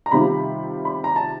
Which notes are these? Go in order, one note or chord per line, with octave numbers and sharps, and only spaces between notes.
A#5
C3 D#3 G3 C4 F4 B5
B5
A#5
A5